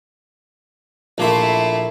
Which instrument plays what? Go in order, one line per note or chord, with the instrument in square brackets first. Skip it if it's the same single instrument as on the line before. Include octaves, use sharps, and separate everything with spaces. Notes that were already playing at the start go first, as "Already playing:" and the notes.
[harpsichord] A#1 A#3 C6 [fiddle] A3 E4